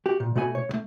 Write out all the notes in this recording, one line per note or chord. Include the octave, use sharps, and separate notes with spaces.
F#4 G4
A#2
B2 A3 F#4 D#5 G#5 B5
C#5
C2 A3